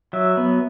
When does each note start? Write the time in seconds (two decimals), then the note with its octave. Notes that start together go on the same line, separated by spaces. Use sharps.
0.13 F#3 E5
0.37 B3